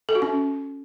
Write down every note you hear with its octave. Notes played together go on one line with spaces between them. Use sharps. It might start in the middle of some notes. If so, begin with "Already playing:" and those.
A4
F#4
C#4